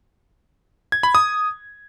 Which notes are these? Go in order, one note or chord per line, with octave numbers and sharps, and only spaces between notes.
G#6
B5
D#6